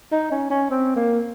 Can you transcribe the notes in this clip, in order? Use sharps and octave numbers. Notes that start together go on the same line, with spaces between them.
D#4
C#4
C#4
C4
A#3